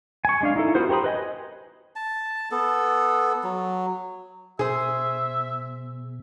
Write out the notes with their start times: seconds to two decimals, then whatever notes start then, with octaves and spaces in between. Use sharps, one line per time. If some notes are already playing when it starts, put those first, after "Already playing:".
0.25 G#5 C#6
0.41 G#3 D4 F5
0.56 D#4 E4 A4
0.75 B3 F4 F#4 A#4 C5
0.89 G4 A#4 C5 B5 D#6
1.04 B4 D#5 G#5
1.96 A5
2.51 B3 A4
3.44 F#3
4.59 B2 G#4 C5 E5